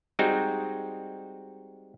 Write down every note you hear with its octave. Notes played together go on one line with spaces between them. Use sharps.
G3 G#3 C4 D#4 F#4